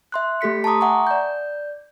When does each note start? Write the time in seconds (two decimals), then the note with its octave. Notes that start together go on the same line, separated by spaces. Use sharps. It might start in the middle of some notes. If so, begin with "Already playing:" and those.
0.12 E5 C6 F#6
0.41 A3 G4 A4 B6 C#7
0.64 A5 A#5 C6 D6 D#6
0.81 E5 F#5 G#5 A#5 C#6
1.07 D5 G6